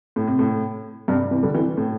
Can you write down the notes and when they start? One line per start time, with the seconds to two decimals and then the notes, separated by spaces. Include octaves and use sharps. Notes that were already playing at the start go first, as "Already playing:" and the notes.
0.16 A2
0.27 C3
0.39 A2
1.08 G2 C3
1.31 C3 E3
1.43 D3 G3
1.55 C3 E3
1.77 A2